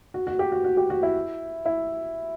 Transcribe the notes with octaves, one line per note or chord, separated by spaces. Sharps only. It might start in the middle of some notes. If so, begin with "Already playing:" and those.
F#4
F#4
G4
F#4
F#4
G4
F#4
E4
E4